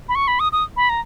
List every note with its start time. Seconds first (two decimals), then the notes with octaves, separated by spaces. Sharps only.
0.09 B5
0.15 C#6
0.28 B5
0.40 D#6
0.52 D#6
0.77 B5
0.89 A#5